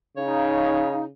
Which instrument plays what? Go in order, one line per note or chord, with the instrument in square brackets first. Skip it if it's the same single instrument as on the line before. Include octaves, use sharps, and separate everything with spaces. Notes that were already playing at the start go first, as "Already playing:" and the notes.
[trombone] C#3 [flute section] D#4 [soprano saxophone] C#5 [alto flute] F5